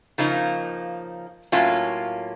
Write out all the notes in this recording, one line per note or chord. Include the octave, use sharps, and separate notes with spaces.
C#3 F3 A#3 D#4
A2 F#3 A#3 C#4 F4